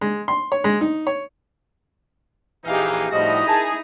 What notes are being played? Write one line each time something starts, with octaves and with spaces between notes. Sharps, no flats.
G#3
C6
C#5
G#3
D#4
C#5
A#1 E3 D#4 G4 G#4 F5
A2 F3 G3 D#4 E4 F#4 D#5 A#6
G#4 A#4 A5